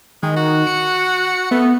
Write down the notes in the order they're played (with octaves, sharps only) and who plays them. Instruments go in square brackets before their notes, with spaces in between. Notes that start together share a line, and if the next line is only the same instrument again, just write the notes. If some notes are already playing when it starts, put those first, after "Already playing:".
[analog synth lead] D#3 [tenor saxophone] G#3
[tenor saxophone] F#4
[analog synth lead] C#7
[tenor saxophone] A3 [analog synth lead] B3